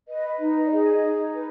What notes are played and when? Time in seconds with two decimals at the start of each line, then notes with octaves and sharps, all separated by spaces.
0.08 B4 D#5
0.39 D#4
0.66 D5
0.71 G#4 D#5
1.02 D#4
1.33 B4